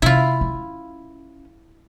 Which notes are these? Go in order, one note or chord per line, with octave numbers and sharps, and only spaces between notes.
C3 E4 F4
C#4